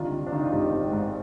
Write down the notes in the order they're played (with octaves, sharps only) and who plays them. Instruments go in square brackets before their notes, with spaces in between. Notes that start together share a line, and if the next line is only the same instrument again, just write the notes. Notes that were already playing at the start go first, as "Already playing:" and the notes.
Already playing: [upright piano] C2 D#3 D4 F4
D#3
D4
D#3 D#4
F4
G#1 D#4 G4
G#1
G#2